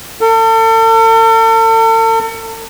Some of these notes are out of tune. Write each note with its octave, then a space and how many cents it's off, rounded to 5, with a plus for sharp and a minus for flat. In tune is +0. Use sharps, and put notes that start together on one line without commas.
A4 +40